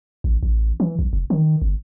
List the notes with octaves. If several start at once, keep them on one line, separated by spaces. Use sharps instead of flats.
A1
A1
E3
B1
F1
D#3
G1